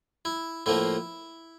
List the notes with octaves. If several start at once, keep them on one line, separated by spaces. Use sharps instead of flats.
E4
A2 F3 A#3 E4